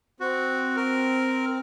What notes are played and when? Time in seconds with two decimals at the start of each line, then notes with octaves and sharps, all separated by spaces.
0.20 C4 F#4
0.76 A#4